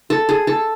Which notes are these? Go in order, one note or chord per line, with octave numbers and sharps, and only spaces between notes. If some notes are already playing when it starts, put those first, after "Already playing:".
A4
G#4
A4